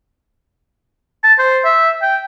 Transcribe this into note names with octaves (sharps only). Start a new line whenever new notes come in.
A5
C5
E5
G5